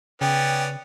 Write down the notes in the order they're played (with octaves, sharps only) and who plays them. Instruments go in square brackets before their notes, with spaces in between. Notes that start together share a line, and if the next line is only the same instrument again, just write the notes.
[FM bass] C#3 [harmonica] B3 C#4 D5 [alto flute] G5